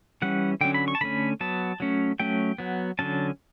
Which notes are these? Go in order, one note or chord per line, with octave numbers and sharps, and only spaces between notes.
E3 G3 C#4 F#5
D3 F#3 C#4 G5
B5
C#6
A5
D3 A3 C#4 B5
F#3 B3 A5
F#3 A3 C#4
F#3 A3 C#4 G5
F#3 B3
D3 F#3 C#4 A5